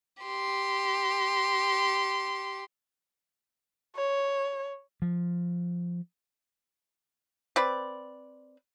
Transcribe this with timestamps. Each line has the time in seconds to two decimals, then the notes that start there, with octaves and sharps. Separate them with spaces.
0.23 G4 C6
3.96 C#5
5.02 F3
7.56 C4 B4 D5